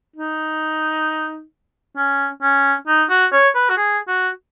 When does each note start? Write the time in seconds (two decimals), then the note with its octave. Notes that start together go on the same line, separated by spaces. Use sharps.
0.16 D#4
1.97 C#4
2.42 C#4
2.88 D#4
3.10 F#4
3.33 C#5
3.55 B4
3.70 F#4
3.77 G#4
4.08 F#4